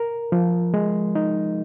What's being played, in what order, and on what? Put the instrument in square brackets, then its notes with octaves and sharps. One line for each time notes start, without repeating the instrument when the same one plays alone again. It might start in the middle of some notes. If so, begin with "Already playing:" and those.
Already playing: [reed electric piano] A#4
F3
G#3
D#4